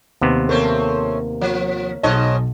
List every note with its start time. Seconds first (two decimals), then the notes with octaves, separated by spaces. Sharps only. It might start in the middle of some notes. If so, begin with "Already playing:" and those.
0.21 D#2 C3 B3
0.49 A3 A#3 C4 C#4
1.41 F3
2.03 B1 G#2 C#5 D#5 A5